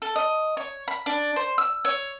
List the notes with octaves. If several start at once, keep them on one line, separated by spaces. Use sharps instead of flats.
A4
D#5
C#5
B5
D4
C5
E6
C#5